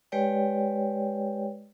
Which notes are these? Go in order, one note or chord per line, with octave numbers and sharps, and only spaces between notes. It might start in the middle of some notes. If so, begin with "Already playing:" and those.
G#3 G4 B4 C#5 D5 G5